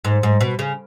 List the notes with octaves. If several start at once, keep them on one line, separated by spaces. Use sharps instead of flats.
G#2
G#2
B2
C#3